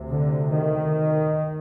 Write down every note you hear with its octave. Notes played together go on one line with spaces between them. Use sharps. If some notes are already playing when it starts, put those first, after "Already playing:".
Already playing: D2 C3
D3
D#3